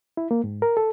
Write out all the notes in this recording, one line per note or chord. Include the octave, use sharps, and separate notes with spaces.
E4
A#3
G#2
A#4
A4